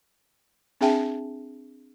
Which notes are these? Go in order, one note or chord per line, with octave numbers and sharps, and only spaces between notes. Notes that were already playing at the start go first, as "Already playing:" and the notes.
C4 D4 G#4 E5 G5 A5